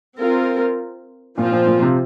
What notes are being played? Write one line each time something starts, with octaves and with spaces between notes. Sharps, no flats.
C4 F4 A#4
A#2 F3 C4 F4
A#2
A#2
C3